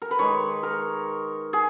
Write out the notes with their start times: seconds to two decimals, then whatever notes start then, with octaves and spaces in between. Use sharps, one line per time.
0.02 A#4
0.11 B4
0.19 D#3 G#3 D#4 C#5
0.63 A#4
1.53 G#4